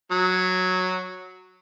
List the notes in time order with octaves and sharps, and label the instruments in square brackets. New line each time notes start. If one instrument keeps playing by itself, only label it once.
[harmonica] F#3